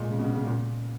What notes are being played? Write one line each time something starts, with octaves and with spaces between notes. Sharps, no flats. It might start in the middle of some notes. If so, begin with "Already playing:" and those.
Already playing: A#2 G#3
C#3
B2
C#3
C#3
A#2